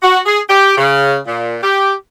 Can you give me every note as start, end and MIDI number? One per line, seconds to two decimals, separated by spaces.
0.02 0.18 66
0.26 0.39 68
0.49 0.76 67
0.77 1.16 49
1.26 1.56 46
1.62 1.92 67